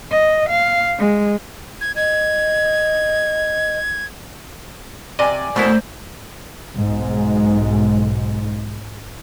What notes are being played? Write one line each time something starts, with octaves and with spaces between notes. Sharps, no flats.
D#5
F5
G#3
G#6
D#5 G#6
C3 D5 D#5 G#5
B2 A3 B3 C#4 E4 A#4 C5
B1 G#2 G#3